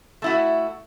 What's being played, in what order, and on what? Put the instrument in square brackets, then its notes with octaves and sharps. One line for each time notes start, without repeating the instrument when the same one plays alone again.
[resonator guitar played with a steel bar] A3 E4 F#4